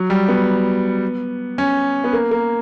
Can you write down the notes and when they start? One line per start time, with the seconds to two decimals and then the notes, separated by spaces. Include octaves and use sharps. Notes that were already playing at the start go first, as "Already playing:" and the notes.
Already playing: F#3
0.10 G3
0.29 B3
1.58 C#4
2.04 B3
2.13 A#3
2.31 A#3